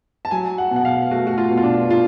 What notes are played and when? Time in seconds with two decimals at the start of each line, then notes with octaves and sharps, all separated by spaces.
0.25 A5
0.31 F#3 G#5
0.58 F#5
0.71 B2
0.76 F#5
0.85 F5
1.11 A3 F#4
1.27 F#4
1.38 F4
1.51 B2
1.57 F4
1.63 D4
1.90 F4